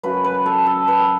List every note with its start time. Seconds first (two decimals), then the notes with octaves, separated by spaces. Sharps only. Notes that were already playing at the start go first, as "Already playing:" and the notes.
0.03 F#2 C#3 F#3 B4
0.24 B4
0.46 A4
0.66 A4
0.88 B4